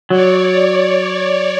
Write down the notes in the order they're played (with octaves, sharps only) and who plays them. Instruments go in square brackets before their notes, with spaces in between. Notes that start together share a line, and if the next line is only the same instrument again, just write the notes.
[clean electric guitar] F#3 [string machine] C#5 D5